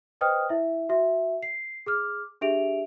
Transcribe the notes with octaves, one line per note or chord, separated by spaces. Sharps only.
B4 C5 D#5 G5 D#6 F6
E4 E5
F#4 E5
C7
G#4 D6 F6
D4 G4 G#4 E5 D7 F7